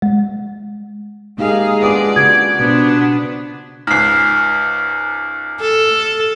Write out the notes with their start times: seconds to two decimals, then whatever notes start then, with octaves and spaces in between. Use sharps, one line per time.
0.02 G#3
1.38 G#3 A#3 D#4 G4 G#4 F5
1.81 B3 D4 F4 B4 D5
2.16 C#3 F#4 B4 G#6
2.59 B2 B3 D4 F#4 C5
3.87 C#2 G#2 F6 C7
5.61 A4